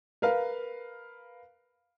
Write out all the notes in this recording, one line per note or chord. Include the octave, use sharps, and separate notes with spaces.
A#4 B4 F5